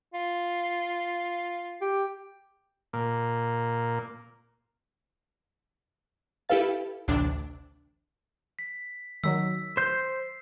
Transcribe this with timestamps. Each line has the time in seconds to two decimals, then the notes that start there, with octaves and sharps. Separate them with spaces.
0.14 F4
1.81 G4
2.93 A#2
6.49 E4 G4 A4 B4 F5 A6
7.08 A1 D2 C3 D4
8.59 B6
9.24 D#3 F#3 E6 B6
9.77 C5 G6 C7